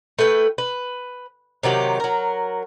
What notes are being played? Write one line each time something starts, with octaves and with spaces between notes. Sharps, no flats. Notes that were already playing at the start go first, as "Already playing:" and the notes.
A3 E4 B4 G5
B4
C3 D#3 F#3 G4
F#3 A#4